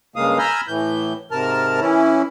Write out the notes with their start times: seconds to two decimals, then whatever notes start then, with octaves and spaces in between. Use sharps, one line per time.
0.16 G2 C#3 G#3 A#3 F5 D#6
0.38 G#5 A#5 B5 E6 F6 G6
0.68 A2 E3 G6
1.31 G#2 C3 A#4 A5 F6
1.80 E3 C#4 E4